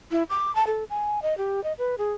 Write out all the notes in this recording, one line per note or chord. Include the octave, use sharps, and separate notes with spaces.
E4
D6
A5
A4
G#5
D#5
G4
D#5
B4
G#4